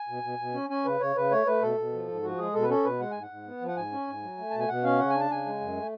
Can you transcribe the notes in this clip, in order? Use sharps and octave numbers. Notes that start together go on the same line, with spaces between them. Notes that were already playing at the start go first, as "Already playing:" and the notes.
Already playing: G#5
B2
B2
B2
C#4
C#4 G#5
C#3 B4
C#3 C#5
C#3 B4
A3 C#5
A3 B4
B2 A4
B2
F3
G#2
F3 F#4
G#3 G#4
B2 A4
B4
C#4 A4
B2 B4
G#3 F#5
G#2 G#5
F#5
G#2
B3
F3
F#5
G#2 G#5
C#4
G#2
F#3
A3
B2 A5
G#5
B2 F#5
C#4 F5
C#3 F#5
D4 G#5
A5
C#3 G#5
G#3
F#2
A3